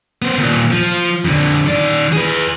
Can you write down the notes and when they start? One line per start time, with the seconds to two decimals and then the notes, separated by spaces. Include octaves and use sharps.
0.22 B3 C5
0.38 D#2 A#2
0.71 F3
1.25 F2 D3
1.67 D#3 D5
2.13 G#4 B4